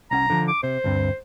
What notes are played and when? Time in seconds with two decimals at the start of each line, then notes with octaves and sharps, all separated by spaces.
0.11 C2 C#4 F#5 A#5
0.30 D3 F3
0.48 D6
0.63 C3 C5
0.84 D2 G2 C4